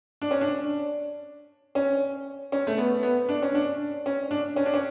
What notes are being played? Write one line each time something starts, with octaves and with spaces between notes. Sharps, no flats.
D4
C#4
D4
C#4
C#4
A3
B3
B3
D4
C#4
D4
C#4
D4
C#4
D4
C#4